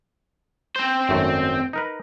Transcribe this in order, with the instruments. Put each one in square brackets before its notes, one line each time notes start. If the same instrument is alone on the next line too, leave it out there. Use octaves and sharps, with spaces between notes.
[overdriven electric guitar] C4 C5
[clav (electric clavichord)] G#1 F#2 A3
D#4 A#4 B4